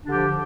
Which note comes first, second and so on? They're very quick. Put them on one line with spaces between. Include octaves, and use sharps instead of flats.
D4 D3 G4 F3